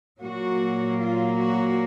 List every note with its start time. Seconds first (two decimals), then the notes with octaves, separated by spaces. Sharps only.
0.21 A#2 F#3 A#3 F#4
0.99 F4
1.39 F#4